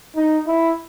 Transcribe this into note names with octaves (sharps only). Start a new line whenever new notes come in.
D#4
E4